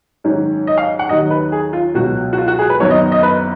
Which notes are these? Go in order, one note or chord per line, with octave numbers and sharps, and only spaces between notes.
G#2 D#3 F#3 C#4
D#5
F5
F#5
D#2 D#3 F#3 D#5
B4
G#4
F4
C#2 B2 F#3 F#4
F#4
F4
F#4
G#4
B4
F#1 F#2 D#3 F#3 B3 C#5
D#5
D#5
B4